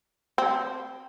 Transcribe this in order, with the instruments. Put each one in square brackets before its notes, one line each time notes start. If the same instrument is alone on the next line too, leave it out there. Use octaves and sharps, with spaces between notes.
[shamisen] C4